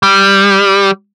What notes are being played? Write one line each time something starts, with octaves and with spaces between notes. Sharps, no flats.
G3